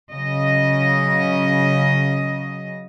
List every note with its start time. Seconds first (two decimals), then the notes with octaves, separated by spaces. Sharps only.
0.12 C#3 F#3 D#5